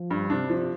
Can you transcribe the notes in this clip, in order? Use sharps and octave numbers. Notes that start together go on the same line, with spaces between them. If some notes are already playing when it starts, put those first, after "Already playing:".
Already playing: F3
G2
C3 D4
F3